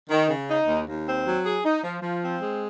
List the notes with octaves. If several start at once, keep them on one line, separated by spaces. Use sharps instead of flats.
D#3
C#3
D#4
D#2
D#2
C4
F#3
G#4
D#4
F3
F3
C4
G#3